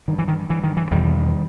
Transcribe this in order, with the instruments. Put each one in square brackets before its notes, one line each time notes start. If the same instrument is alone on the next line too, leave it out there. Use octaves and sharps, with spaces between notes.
[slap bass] G2 D#3
E3
D#3
G2 E3
D#3
E3
E2 B2 D#3 G3